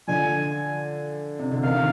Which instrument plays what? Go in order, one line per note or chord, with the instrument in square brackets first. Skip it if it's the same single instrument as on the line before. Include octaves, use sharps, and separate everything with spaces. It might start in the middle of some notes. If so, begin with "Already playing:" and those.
[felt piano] D3 F3 [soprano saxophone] G#5
[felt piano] C3
D3
[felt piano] C3 D#3 [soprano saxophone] F5
[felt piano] C3